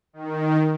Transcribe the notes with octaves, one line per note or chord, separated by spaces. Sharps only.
D#3